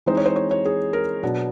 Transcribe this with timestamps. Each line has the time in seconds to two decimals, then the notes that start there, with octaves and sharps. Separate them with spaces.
0.06 E3 G#3 C4 D#4 C5
0.17 C#5
0.26 C5
0.36 C#5
0.51 C#5
0.65 G#4
0.93 A#4
1.23 B2 F#3 B3 D4